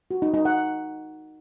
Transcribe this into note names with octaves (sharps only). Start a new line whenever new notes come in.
F#4
D#4
D#4
F#5